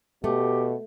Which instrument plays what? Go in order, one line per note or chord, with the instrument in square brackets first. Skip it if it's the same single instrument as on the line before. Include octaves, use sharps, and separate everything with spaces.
[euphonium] B2 [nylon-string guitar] A3 [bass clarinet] G4